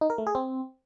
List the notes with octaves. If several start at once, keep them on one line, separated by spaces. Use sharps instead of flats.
D#4
A#4
A3
G#4
C4